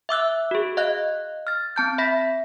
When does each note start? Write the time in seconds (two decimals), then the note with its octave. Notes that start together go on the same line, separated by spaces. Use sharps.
0.09 E5 D6 E6 F#6
0.51 F#4 G#4
0.77 D#5 F5 F#6
1.47 F6 A6
1.76 C4 A5 G6
1.98 E5 B5 A#6 B6